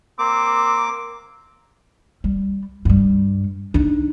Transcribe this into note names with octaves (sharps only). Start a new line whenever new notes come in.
A#3 C4 D6
G3
G2 G3
D4 D#4